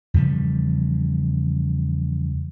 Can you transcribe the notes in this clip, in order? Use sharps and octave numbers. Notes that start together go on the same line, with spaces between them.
E2 C#3 F3 G3